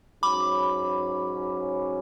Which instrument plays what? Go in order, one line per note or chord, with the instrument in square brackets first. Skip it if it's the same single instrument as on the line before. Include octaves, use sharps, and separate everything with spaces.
[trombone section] G#2 F#3 C#4 [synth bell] B5 D6